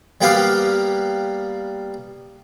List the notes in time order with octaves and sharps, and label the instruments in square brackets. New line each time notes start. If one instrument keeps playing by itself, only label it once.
[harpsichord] G3 A#3 B3 G4 B4 F5